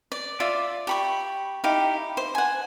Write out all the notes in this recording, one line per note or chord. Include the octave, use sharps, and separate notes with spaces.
D5
F4 D5 E5 D6
G4 B5 C#6
D#4 E4 G4 F5
C5
F#5 G#5